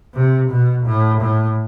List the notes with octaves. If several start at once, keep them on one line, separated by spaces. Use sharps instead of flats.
C3
B2
A2
A2